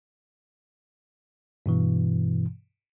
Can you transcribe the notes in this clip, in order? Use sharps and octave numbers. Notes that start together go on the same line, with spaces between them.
G2 B2 E3